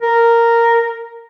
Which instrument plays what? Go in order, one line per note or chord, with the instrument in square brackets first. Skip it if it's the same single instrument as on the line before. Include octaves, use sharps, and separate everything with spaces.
[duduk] A#4